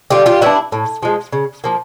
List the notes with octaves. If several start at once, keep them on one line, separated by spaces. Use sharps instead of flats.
D3 F4 G4
F4 G4
G3 B3 D4 E4 F#4
A2
F3 G#3
C#3
F3 A#3